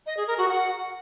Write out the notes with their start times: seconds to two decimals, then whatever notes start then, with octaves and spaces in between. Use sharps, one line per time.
0.06 D#5
0.17 G#4
0.27 A#4
0.38 F#4
0.48 F#5